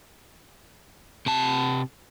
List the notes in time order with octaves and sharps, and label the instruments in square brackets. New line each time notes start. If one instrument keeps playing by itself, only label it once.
[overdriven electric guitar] C3 A5